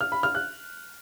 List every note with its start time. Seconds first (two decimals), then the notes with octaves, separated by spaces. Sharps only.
0.01 F6
0.12 B5
0.23 F6
0.35 F#6